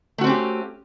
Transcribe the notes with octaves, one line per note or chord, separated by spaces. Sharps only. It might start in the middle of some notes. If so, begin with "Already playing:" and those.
A3 C4 C#4 F#4 G4